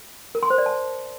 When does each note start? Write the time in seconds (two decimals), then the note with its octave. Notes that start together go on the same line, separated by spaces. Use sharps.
0.35 A#4
0.43 C6
0.50 C5
0.58 D5
0.66 A5